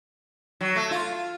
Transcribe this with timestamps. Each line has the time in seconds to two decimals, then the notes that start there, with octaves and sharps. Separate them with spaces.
0.61 F#3
0.76 A3
0.91 F4